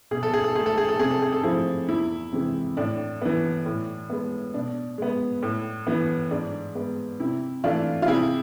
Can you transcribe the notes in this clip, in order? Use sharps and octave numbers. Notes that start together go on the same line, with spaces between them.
B2 G#4
A4
G#4
A4
A3 G#4
A4
G#4
A4
C3 G#4
A4
G#4
A4
F3 A3 E4 G#4
E2 E4
C3 E3 G#3
A2 D4
E3 B3
A2
G#3 B3
B2 D4
G#3 B3
A2
E3 B3
G#2 D4
G#3 B3
C3 E4
E3 A3 D4 F4
F4
C3 E4 G#4